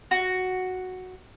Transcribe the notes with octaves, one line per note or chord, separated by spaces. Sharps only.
F#4